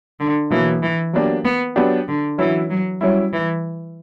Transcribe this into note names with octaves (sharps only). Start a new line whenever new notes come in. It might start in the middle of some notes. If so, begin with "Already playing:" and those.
D3
B2 E3 F#3 A#3
E3
F#3 A#3 B3 D4 G4
B3
F#3 B3 D4 G4
D3
E3 F#3 C#4 E4
F#3
F#3 G3 C#4 E4
E3